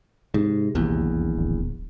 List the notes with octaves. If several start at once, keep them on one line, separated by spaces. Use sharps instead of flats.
G#2 C3
D#1 A#1 E2
D1